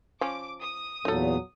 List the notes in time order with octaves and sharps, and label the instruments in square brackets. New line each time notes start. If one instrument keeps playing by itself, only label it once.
[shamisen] F3 C#4 [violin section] D6
[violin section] D#6
[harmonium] E2 A#2 [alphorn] F#3 [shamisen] D#4 A4